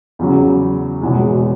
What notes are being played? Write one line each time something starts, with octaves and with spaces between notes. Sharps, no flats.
E2 C#3 F#3
E1 E2 B2 G#3